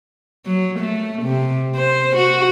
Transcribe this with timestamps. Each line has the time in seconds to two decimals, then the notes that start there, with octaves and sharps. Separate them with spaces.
0.46 F#3
0.79 A3
1.22 C3
1.76 C5
2.16 F#4